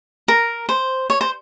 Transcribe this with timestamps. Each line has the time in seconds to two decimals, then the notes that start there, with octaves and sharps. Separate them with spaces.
0.28 A#4
0.69 C5
1.10 C#5
1.21 C5